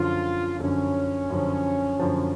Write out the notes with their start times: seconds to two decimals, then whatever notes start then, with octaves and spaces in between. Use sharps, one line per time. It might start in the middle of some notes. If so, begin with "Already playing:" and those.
Already playing: F#2 D3 F3 F4
0.59 F#2 D3 F3 C#4
1.30 F#2 D3 F3
1.99 F#2 D3 F3